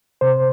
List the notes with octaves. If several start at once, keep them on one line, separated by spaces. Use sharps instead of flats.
C3 C5